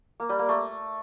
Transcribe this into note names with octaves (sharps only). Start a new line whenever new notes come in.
A#3
G3
A#3
A3